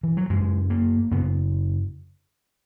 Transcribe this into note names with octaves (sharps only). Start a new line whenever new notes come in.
E3
F#3
F#2 C#3 G#3
A#3
F#2 C#3 B3